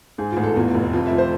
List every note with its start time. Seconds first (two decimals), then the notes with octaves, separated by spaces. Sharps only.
0.18 G#2 G#4
0.31 F4
0.37 A1
0.44 A4
0.56 E2 F4
0.74 F1
0.93 F2 F4
1.06 E5
1.12 F3
1.18 C5